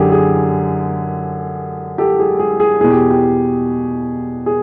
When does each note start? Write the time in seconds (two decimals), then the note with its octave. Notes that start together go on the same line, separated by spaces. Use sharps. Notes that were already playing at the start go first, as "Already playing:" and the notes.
Already playing: F#2 D3 G4 G#4
0.12 G#4
1.98 G4 A4
2.19 G#4
2.39 G#4
2.60 G#4
2.81 E2 B2 G#4
2.90 G4
3.11 G4
4.46 G#4